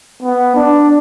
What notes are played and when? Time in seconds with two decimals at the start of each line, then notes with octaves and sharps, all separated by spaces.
0.23 B3
0.55 D4